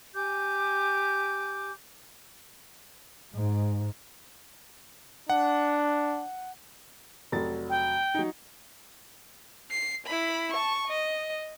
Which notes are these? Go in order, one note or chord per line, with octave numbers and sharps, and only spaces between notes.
G4 G#5 D6 G6
G#2
D4 F#5
F1 F#3 A6
G5
F#3 D#4
C7
E4 B5
A5 C#6
D#5